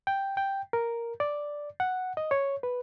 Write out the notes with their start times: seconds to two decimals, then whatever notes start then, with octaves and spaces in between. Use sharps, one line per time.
0.07 G5
0.37 G5
0.73 A#4
1.20 D5
1.80 F#5
2.17 D#5
2.31 C#5
2.63 B4